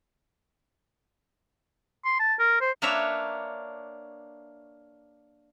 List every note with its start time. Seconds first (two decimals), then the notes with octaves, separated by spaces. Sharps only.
2.05 C6
2.19 A5
2.39 A#4
2.61 C5
2.82 A#3 D4 B4 C#5 E5 A#5